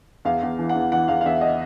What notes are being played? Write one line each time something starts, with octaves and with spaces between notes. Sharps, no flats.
E2 F5
E2
E3
F#5
E2
E3 F#5
E2 F5
F5
E2 E5
D#5